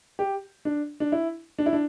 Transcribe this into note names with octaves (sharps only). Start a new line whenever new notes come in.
G4
D4
D4
E4
D4
E4
D4